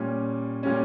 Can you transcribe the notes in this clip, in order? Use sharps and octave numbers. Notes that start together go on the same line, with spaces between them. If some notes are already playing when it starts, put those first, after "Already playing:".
Already playing: A#2 G3 C#4
A#2 G3 C#4